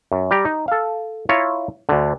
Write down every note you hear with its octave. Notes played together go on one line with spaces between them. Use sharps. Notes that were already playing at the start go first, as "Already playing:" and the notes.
F#2
G3 G4 A#5
D#4
A4 F5
E4 F4 C#5 A#5
D2 D3